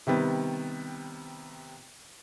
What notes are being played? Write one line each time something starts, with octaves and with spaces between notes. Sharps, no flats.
C3 D#3 G3 B3